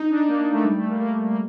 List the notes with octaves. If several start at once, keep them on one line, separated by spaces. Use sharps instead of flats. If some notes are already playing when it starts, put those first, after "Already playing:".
Already playing: D#4
D4
A#3
A#3
A3
G3
A3
A#3
A#3
A#3